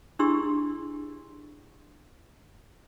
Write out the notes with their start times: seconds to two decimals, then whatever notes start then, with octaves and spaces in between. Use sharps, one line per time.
0.19 D4 E4 G4 G#4 C6 E6